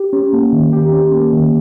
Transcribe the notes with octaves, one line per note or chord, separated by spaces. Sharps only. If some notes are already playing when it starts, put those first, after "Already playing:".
Already playing: G4
C#4
A#3
D#3
G4
C#4
A#3
D#3